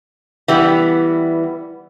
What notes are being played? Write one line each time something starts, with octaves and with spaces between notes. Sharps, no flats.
E3 G3 B3